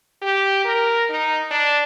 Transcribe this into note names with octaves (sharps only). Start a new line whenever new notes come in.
G4
A#4
D#4
D4